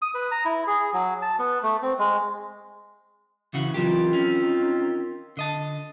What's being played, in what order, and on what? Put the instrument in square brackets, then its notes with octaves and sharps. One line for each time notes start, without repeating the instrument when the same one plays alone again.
[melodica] D#6
B4
A#5
E4
G#4
F#3
A5
B3
A3
C4
G#3
[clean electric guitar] C#3 E3 F#4
[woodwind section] D#3 C4 F4 [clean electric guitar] E3 F#3 G4
[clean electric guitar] C#4
D3 D#5 A5